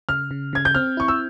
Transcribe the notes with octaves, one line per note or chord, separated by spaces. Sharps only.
C#3 F6
C#3
C#3 G#6
G6
C4 F6
E4 C#6
E6